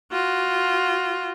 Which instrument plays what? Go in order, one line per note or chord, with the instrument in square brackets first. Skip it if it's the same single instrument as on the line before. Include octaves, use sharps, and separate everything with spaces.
[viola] F4 F#4